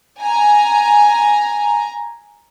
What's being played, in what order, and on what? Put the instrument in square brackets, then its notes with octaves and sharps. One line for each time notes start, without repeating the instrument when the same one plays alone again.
[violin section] G#5 A#5